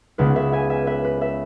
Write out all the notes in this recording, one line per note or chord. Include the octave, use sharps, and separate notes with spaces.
C#2 C#3 G#3 B3 B4
B4 E5
E5 G#5
E5 G#5
B4 E5
B4
B4 E5